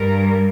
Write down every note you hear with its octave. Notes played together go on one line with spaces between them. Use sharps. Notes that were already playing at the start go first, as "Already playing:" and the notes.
Already playing: G2 G3 A#4